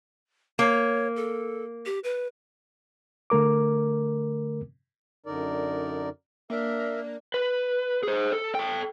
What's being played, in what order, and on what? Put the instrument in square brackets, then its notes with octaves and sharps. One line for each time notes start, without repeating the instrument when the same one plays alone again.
[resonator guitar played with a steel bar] A#3 [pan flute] C#5
[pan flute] A4
G4
B4
[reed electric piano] D3 A3 A#4 D6
[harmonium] F#2 D3 D#4 A#4 D5
[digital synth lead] A#3 [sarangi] D4 [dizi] A#4 [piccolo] E5
[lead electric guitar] B4
G#4 C5
A4
A4 G5